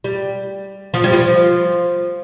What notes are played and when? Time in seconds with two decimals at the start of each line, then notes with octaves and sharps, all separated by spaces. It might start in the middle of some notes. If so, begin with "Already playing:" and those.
0.04 G3
0.94 F3
1.04 G3
1.13 F3